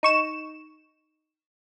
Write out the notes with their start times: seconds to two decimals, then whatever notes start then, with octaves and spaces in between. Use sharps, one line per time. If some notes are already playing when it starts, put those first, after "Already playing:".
0.03 D#4 C#6 E7